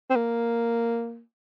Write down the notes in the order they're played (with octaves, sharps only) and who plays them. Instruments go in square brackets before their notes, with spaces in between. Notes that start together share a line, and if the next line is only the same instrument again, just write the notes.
[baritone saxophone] C4
A#3